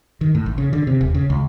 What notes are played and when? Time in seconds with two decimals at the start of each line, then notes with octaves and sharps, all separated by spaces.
0.21 D#3
0.35 A2
0.46 A1
0.58 C#3
0.73 D3
0.87 C3
1.01 D#1
1.15 C#3
1.30 C#2